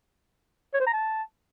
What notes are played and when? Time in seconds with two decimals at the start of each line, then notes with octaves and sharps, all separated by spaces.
0.74 C#5
0.80 C5
0.87 A#5
0.93 A5